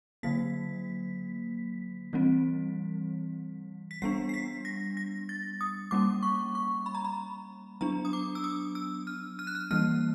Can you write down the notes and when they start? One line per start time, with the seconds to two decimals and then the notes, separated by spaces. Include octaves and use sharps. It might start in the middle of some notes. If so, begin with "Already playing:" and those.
0.23 D3 F#3 A#3 B6
2.13 E3 G3 C4
3.91 B6
4.02 G3 B3 D4 C7
4.29 C7
4.34 B6
4.65 A#6
4.97 A#6
5.29 A6
5.61 D#6
5.91 G3 A#3 C#4 D6
6.23 C#6
6.55 C#6
6.86 B5
6.95 A#5
7.05 B5
7.81 F#3 B3 D4 A#5
8.05 D#6
8.13 D6
8.35 E6
8.44 D#6
8.75 E6
9.07 F6
9.39 F6
9.47 F#6
9.55 F6
9.71 E3 G3 A#3 F6